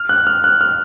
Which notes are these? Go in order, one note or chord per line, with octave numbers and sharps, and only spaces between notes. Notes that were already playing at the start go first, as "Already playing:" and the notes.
Already playing: F6
F#6
F6
F#6
F6